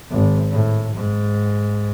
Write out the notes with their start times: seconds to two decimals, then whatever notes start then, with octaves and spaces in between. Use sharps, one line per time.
0.11 G#1
0.51 A2
0.95 G#2